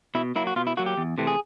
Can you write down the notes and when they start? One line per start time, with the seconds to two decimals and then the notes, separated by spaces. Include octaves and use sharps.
0.15 B2 E4
0.36 F#3 A#3 E4
0.47 F#4
0.56 B2 F4
0.67 E4
0.77 F#3 A#3 F#4
0.86 G4
0.97 E2
1.18 C3 E3 A3 C4
1.27 G#4